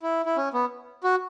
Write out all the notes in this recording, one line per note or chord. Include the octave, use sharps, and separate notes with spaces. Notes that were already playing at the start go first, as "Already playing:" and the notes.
E4
E4
C#4
B3
F#4